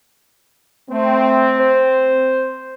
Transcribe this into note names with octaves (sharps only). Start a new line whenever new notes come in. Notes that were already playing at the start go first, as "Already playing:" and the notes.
A3 C4
C5